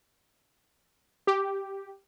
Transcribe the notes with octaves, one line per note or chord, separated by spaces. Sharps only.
G4